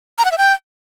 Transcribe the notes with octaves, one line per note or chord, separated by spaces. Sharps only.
A#5
F#5
E5
G5